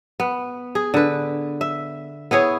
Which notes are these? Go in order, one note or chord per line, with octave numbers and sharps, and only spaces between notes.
B3
G#4
D3 B4
E5
B3 E4 G#4 C#5